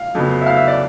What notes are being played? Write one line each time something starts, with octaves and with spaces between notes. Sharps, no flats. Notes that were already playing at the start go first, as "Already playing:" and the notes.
Already playing: F5
F2 C#3 F#3 B3
E5
F5
E5
D5